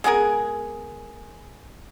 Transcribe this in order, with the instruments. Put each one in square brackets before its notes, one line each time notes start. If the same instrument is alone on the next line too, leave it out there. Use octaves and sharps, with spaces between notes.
[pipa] G#3 B3 G#4 A#4